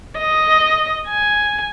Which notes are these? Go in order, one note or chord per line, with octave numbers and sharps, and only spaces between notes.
D#5
G#5